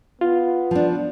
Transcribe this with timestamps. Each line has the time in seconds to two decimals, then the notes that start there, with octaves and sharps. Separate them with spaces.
0.21 B3 F4
0.71 F3 D4